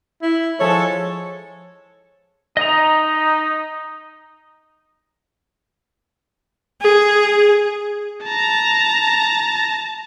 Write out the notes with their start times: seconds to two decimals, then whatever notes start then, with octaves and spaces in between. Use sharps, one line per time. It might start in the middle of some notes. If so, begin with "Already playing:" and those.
0.22 E4
0.60 F3 G#3 A4 C#5
2.57 D#4 D#5 A#5
6.82 G#4
8.24 A5 A#5